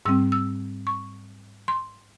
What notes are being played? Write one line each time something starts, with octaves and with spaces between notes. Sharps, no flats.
G#2 G3 C4 E6
E6
C#6
C6